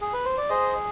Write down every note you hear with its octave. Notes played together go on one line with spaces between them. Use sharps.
G#4
B4
C5
D5
G#4 C5 D#5